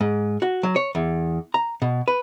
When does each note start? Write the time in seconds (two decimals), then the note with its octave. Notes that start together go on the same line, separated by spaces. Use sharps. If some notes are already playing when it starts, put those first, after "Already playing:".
0.01 G#2
0.42 F#4
0.63 F#3
0.76 C#5
0.95 E2
1.54 A#5
1.82 B2
2.08 B4